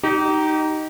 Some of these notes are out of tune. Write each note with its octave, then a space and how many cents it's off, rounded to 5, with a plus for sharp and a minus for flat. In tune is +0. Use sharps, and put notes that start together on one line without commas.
D#4 +0 G4 -30